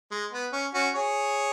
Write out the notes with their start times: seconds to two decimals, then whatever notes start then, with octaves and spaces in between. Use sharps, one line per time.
0.11 G#3
0.32 B3
0.53 C#4
0.74 C#4 F#4
0.95 G#4 C#5